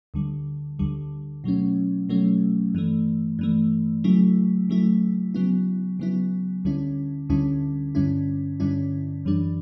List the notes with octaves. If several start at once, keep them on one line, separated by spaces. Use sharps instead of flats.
D2 D3 G3
D2 D3 G3
B2 F#3 A3 C#4
B2 F#3 A3 C#4
G2 E3 A3
G2 E3 A3
C#3 F#3 A3 E4
C#3 F#3 A3 E4
C#3 F#3 B3 E4
C#3 F#3 B3 E4
D2 D3 G3 C#4 E4
D2 D3 G3 C#4 E4
G2 D3 G3 C#4 E4
G2 D3 G3 C#4 E4
F#2 E3 G3 D4